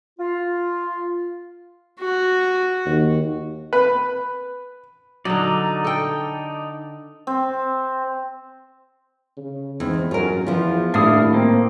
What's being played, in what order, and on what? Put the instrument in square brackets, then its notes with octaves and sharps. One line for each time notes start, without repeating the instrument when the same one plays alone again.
[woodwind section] F4
[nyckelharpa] F#4
[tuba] D#2
[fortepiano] B4
[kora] D3 F#3 [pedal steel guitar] D#4 D5
[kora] A4 G5
[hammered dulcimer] C4
[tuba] C#3
[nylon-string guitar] E2 [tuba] G#2 [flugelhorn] C4
[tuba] F#2 [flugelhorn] C#4 [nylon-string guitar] F4 A#4
[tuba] E2 [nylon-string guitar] F3 B3 [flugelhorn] F4
[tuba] D#1 [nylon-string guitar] A2 [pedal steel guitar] D4 F5 D#6 [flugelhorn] E4
[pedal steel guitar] A#3 [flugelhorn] C4